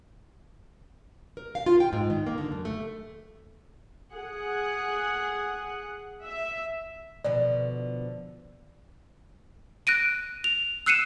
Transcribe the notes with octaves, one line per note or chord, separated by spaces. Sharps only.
A#4
F5
F4
G5
G#2
D#3
A#3
D3
F#2
A3
G#4 F#5
E5
B2 D3 F3 D5
F#6 A#6 D7 D#7
F7
E6 F#6 C7 C#7 D#7 E7